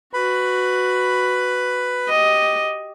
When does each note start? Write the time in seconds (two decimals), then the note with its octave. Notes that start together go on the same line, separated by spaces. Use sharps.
0.14 F#4 B4 B5
2.09 G4 D#5